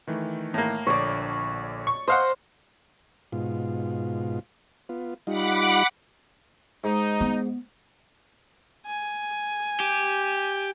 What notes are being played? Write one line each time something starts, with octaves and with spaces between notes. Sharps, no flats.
D#3 E3 A3
A2 A#3
A#1 D3 C#5 D5
C#6
C5 D#5 F5 F#5
G#2 B2 F4
B3 F4
G3 D#4 F4 F#5 B5 D6
G#2 D#4
B3
G#5
G4